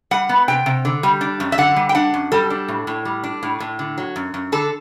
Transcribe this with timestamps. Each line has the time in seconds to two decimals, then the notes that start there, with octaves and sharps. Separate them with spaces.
0.11 G3 F#5
0.29 B3
0.48 C3 G5
0.66 C3
0.85 D3
1.03 G3
1.21 D4
1.40 F#2
1.52 E5
1.58 D3 F#5
1.76 G3
1.89 G5
1.95 D4 F#5
2.14 F#2
2.32 G3 A4
2.50 D4
2.68 A2
2.87 A2
3.05 G3
3.24 D4
3.43 A2
3.60 A2
3.79 D3
3.98 F#3
4.16 F#2
4.34 F#2
4.52 D3 A4